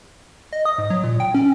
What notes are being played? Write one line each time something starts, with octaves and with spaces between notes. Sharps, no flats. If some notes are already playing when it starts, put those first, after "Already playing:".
D#5
D#6
G#2
F#3
A#2
G5
C#4